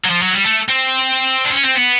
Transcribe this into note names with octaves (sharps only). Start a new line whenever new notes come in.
F#3
F3
F#3
G3
A3
C4
D4
C#4
C4
B3